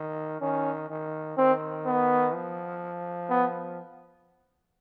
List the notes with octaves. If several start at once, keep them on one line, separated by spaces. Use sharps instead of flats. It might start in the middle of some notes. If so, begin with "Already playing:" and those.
Already playing: D#3
D#3 C#4
D#3
D#3 C4
B3
F3
B3